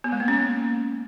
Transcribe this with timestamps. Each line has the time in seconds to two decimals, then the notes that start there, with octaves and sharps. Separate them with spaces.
0.04 B3
0.12 G#3
0.20 A#3
0.28 C#4